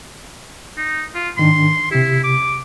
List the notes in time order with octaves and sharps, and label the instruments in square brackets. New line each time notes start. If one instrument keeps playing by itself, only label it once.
[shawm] D#4
F4
[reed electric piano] G#2 D#3 D4 [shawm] C6
[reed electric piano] C3 G4 [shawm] E4
[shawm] D6